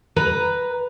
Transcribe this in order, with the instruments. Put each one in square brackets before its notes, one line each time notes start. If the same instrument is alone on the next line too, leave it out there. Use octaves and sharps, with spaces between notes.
[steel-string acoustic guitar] B4 A#5